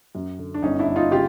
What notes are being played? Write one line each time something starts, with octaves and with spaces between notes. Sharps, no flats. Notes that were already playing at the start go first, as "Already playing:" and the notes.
F#2
D3
D4
G1 C#4 D#4
D4 E4
G1
D#4 F4
C#3 F4 G4